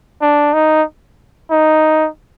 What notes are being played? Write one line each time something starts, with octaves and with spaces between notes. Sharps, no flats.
D4
D#4
D#4